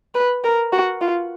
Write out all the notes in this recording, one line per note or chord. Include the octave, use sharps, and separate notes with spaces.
B4
A#4
F#4
F4